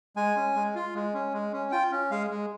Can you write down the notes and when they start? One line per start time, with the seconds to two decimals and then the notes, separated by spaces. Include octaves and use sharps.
0.16 G#3 G#5
0.36 C#4
0.56 G#3
0.75 F4
0.95 G#3
1.14 C#4
1.33 G#3
1.53 C#4
1.72 F4 G5
1.92 C#4
2.11 G#3 F5
2.30 G#3